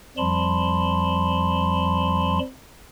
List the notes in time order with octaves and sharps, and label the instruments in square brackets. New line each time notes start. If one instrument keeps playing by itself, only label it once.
[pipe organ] F2 F3 G3 A5 B5 C6